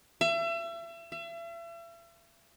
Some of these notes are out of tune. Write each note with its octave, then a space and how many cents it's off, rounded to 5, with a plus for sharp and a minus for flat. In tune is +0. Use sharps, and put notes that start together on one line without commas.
E5 +35
E5 +40